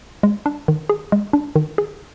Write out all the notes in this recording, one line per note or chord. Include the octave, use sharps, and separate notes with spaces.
G#3
D4
D#3
G#4
G#3
D4
D#3
G#4